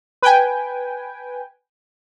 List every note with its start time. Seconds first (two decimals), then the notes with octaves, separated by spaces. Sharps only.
0.22 B4 G5 G#5